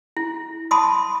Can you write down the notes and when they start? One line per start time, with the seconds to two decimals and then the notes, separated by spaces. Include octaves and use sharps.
0.17 E4
0.71 A5 B5 C6 D6 D#6